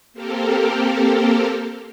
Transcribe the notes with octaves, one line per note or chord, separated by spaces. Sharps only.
A#3 C4 G4 A4 A#4